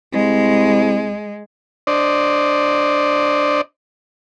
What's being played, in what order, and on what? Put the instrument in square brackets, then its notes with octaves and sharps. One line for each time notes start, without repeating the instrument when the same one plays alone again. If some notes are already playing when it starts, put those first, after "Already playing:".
[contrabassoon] C2 [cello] G#3
[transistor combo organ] D4 C5 D5 D#5